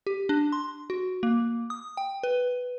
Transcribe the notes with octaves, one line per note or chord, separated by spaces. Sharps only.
G4
D4
C6
F#4
A#3
D#6
G5
B4